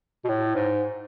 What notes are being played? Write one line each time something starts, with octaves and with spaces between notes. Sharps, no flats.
B2
A2
G#2